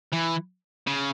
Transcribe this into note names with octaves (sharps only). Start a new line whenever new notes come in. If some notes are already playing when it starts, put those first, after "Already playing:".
E3
C#3